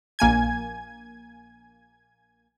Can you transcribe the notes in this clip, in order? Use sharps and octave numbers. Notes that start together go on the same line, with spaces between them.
A#1 A#3 G#5 G#6